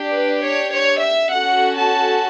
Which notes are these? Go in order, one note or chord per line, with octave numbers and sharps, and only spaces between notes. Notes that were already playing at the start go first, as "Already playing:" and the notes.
Already playing: D4 G4
B4
C#5
C#5
E5
C#4 F#4 A4 F#5
A5